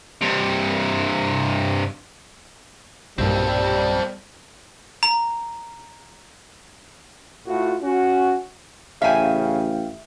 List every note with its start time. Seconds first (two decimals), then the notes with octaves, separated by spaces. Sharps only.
0.22 G2 C3
3.18 B1 G2 A#2 G3 C4 A4
5.03 A#5
7.47 A2 F4 F#4
7.82 C#4 F#4
9.02 A1 C#3 E5 F5 G5 G#5